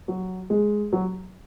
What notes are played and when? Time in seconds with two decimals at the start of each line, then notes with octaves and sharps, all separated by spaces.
0.08 F#3
0.50 G#3
0.93 F#3